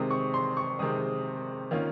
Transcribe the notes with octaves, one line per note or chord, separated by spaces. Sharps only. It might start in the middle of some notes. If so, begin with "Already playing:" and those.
Already playing: C3 D#3 G#3 C4 D#6
C#6
C6
C#6
C3 D#3 G#3 C4 D#6
D#3 A#3 C#4 F4